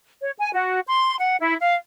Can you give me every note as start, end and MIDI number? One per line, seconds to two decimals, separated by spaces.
0.21 0.32 73
0.38 0.51 80
0.53 0.79 66
0.87 1.15 84
1.19 1.37 78
1.39 1.55 64
1.60 1.76 77